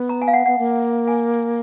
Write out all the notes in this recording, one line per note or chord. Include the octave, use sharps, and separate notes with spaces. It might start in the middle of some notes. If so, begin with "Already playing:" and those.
Already playing: B3
A#5
G#5
F5
F#5
B3 F#5
A#3
G#5